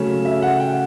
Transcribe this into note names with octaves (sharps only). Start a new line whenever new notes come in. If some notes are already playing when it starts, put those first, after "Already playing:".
Already playing: C#3 F#3 A3 C#4
E5
F#5
G5